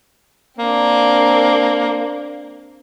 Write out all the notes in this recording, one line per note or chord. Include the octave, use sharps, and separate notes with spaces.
A#3 C4 D4